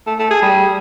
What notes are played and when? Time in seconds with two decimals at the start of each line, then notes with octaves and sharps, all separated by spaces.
0.07 A3
0.19 A3
0.30 G#4
0.42 G3